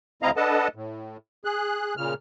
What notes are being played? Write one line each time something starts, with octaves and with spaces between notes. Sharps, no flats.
D2 C4 E4 D#5 F5 A#5
D4 A4 B4 D#5 F#5 A5
A2
G#4 F#6
A#2 C#3 F6